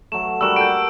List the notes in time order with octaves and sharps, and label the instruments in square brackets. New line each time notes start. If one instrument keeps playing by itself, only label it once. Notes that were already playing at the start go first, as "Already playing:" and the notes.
[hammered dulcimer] F#3 A3 [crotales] E7
[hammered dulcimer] G3 F#4 A#4 [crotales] E6 E7
[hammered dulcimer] G4 A4 A#4 [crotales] G6 D7